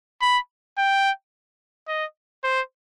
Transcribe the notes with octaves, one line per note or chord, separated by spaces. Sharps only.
B5
G5
D#5
C5